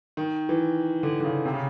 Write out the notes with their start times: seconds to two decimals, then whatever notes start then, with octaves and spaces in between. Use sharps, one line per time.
0.17 D#3
0.49 E3
1.03 D3
1.20 D3
1.24 C#3
1.45 C3
1.54 C#3